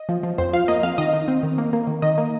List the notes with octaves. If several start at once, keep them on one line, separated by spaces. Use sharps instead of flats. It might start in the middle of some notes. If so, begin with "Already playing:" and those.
Already playing: D#5
F3
F3
F2 C5
F3 F5
A#3 D#5
F2 F5
D#3 D#5
D#3
C4
D#3
A#3
A#3
D#3
D#3 D#5
A#3